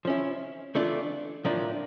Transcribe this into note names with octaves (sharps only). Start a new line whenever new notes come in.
F3 C#4 E4
E3 A3 D4 F4
A2 F3 A#3 D4 F4